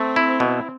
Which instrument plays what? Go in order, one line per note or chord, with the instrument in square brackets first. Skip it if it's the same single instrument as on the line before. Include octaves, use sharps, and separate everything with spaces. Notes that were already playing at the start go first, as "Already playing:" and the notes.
Already playing: [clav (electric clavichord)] A3 [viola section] C4
[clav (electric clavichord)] E4
B2